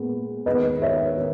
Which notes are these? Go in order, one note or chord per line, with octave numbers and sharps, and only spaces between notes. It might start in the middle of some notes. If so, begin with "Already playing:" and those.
Already playing: A#2 G#3 B3
D#2 D#3 G#3 B3 B4 D#5
C#5 E5
D#3